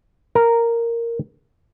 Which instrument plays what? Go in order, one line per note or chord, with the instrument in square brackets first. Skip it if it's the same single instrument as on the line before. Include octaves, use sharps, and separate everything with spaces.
[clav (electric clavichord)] A#4